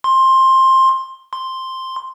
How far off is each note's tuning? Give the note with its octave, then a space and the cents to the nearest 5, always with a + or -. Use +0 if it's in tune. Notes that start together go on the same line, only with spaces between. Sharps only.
C6 +15
C6 +0